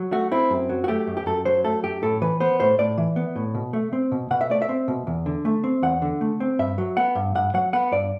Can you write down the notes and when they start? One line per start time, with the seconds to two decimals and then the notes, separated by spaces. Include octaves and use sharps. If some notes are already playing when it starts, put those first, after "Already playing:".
Already playing: F#3
0.12 A3 F#4
0.32 C4 E4
0.50 F#2
0.69 F#3
0.84 F#4
0.88 A3 G4
1.07 F#2
1.17 G4
1.26 F#2 A4
1.45 F#3 C5
1.64 A3 A4
1.83 F#2 G4
2.02 A2 A4
2.22 E3 B4
2.40 B3 C5
2.60 A2 C5
2.79 A2 D5
2.98 E3
3.16 B3
3.36 A2
3.55 B2
3.73 A3
3.93 C4
4.12 B2
4.31 B2 F#5
4.41 E5
4.50 A3 D5
4.62 E5
4.69 C4
4.88 B2
5.07 E2
5.26 D3
5.45 A3
5.64 C4
5.83 E2 F#5
6.02 D3
6.21 A3
6.40 C4
6.59 G2 E5
6.78 F#3
6.97 B3 F#5
7.15 G2
7.35 G2 F#5
7.54 F#3 F#5
7.73 B3 F#5
7.92 G2 D5